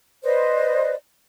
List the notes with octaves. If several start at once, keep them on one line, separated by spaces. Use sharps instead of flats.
B4 C5 D5 D#5